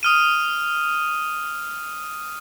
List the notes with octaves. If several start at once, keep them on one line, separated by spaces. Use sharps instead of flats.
D#6 F6 D#7